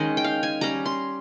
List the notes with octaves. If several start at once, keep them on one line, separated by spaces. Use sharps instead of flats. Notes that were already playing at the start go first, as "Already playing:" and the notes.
Already playing: D#3 G#3 C#4 D#5
G5
F5
G#5
G3 C#4 A#5
C6